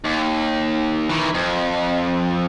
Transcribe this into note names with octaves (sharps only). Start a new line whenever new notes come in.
D#2
D#3 E3
F2